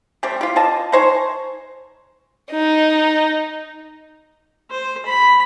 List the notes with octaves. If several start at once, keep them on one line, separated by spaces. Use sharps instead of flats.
G3 A3 C4 G4
F4 G4
F4 D#5 A5
D#4 C5 C#5 G#5
D#4
C5
B5